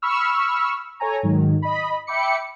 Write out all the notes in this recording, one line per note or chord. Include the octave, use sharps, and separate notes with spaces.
B5 C#6 E6 F6
A4 C#5 G#5 A#5
G#2 D#3 F#3
D#5 B5
E5 G5 B5 D6 C#7